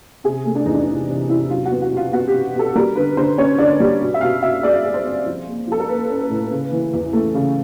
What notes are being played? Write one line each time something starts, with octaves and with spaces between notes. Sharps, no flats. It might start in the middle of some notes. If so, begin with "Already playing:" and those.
C3 G#4
A3
D4
E2 D#4
D4
C3 D#4
C3
C3 E4
F#3 F4
B3 F#4
F#4
B2
F4
B3 F#4
G4
B2
B2 A4
G3 A#4
D3 B4
D3 C5
C#4 C#5
D3 D5
G3
B2
E5
B2 F5
B2 E5
G#3 D5
G#3
C5
C4
F3
A#3
F3 A4
A#4
A#3 B4
C#4
B4
A2
C#3
E3
E2
A3
C#3